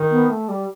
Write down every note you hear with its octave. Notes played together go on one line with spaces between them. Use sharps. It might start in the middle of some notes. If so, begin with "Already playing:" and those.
Already playing: D#3
B3
A3
G3